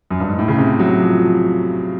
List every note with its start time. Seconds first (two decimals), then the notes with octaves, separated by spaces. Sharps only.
0.11 F#2
0.20 G2
0.29 G#2
0.39 A2
0.48 C#3
0.58 C3
0.79 F#3
1.00 F3
1.20 F3